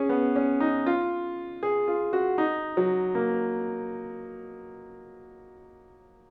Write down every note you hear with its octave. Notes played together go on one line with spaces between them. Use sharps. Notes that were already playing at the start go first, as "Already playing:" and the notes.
Already playing: C#4 G#4
B3
C#4
D#4
F4
G#4
F4
F#4
D#4
F#3
A#3